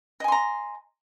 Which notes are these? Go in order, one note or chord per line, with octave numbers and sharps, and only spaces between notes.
D#5 G#5 A#5 C6